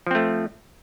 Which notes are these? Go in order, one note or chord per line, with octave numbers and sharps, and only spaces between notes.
F3 A3 C4